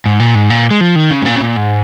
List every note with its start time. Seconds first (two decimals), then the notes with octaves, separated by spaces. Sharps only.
0.06 G#2
0.20 A#2
0.35 G#2
0.50 A#2
0.71 G#3
0.81 F3
0.96 D#3
1.11 C#3
1.22 G#2
1.26 A#2
1.36 C#3
1.41 A#2
1.57 G#2